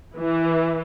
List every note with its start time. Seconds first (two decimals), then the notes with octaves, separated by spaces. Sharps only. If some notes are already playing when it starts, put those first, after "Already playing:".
0.17 E3